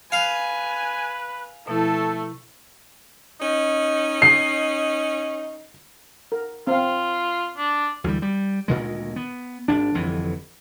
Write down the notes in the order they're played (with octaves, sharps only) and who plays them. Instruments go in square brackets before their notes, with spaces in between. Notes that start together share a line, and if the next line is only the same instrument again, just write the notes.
[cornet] B4 [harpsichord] F5 [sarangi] G#5
[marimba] B2 F3 E4 [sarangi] A3 [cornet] A4
[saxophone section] C#4 D#4
[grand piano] C7
[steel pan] A#4
[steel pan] C4 F5 [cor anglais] F4
[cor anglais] D4
[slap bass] D2 E3 F#3 G3
G3
D2 A#2 D#3 G#3
B3
G#1 D4
G1 F2 E3